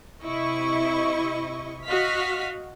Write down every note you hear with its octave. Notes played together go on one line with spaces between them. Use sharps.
C3 E4 D#5 C#6
F#4 D#5 F5 F6 B6